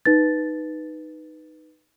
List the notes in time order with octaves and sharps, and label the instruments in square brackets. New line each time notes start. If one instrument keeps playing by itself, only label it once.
[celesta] D#4 B4 A6